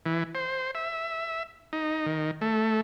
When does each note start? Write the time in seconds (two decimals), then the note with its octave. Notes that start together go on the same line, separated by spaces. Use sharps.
0.06 E3
0.35 C5
0.75 E5
1.73 D#4
2.06 D#3
2.41 A3